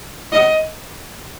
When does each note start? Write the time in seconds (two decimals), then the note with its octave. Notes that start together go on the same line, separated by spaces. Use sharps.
0.32 D#5